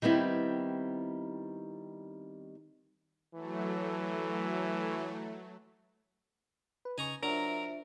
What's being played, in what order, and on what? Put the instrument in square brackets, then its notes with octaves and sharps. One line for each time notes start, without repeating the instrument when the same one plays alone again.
[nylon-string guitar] D#3 G3 B3 C4 E4
[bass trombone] E3 [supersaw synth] F#3 A3
[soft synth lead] B4
[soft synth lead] C#3 [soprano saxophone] D#4 [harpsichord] G#5 A#5 C#6
[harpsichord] F#3 A#5 [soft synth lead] D4 [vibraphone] F4 C5 E5 [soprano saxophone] A#4